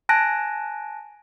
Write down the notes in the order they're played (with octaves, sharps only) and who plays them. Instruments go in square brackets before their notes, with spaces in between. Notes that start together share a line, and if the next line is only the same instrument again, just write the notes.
[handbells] G#5 A5 F#6 A#6 D7